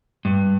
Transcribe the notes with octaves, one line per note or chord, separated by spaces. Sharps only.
G2